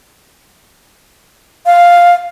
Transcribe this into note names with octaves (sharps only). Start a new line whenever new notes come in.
F5